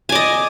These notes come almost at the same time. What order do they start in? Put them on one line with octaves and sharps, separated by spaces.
G#5 D5 D#5